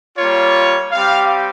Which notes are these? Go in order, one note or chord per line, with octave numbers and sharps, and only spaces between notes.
G3 A#3 F4 C#5
G3 C4 G4 F5